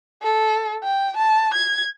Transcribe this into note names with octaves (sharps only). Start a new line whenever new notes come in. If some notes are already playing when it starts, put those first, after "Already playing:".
A4
G5
A5
G#6